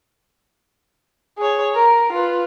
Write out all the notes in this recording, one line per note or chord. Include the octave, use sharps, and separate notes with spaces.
G#4 C#5
A#4
F4 B4